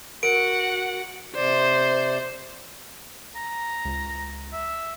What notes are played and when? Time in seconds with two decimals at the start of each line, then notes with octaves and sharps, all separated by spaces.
0.23 F#4 A#4 F#5 D7
1.36 C3 C5 D5
3.36 A#5
3.85 C#2
4.53 E5